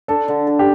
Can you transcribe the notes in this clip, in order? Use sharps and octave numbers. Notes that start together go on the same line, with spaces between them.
D4 A4
D3
A4
G4